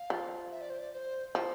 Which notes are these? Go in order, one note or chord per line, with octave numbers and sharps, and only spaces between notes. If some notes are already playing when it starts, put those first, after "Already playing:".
Already playing: F5
F3
E5
D5
C5
D5
C5
F3 E4